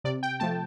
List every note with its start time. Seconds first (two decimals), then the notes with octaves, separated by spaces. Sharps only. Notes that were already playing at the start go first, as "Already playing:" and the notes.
0.04 C3 D5
0.23 G5
0.40 F3 A3 A5